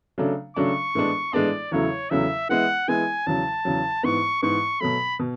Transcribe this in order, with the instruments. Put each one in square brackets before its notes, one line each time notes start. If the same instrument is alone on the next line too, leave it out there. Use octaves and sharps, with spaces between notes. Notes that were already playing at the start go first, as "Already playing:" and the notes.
[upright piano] C#3 F#3 A3 D4
[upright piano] C#3 F#3 A3 D4 [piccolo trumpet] C#6
[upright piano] A2 E3 G#3 B3 D4
[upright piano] A2 E3 G#3 B3 D4 [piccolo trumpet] D5
[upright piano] E2 C#3 F#3 A3 E4 [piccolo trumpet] C#5
[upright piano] E2 C#3 F#3 A3 E4 [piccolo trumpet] E5
[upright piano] E3 G#3 B3 E4 [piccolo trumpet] F#5
[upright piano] E3 G#3 B3 E4 [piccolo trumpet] G#5
[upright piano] E2 C#3 F#3 [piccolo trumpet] A5
[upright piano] E2 C#3 F#3
[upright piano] G#2 E3 B3 [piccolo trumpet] C#6
[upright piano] G#2 E3 B3 [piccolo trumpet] C#6
[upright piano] B2 F#3 A3 [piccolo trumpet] B5
[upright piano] B2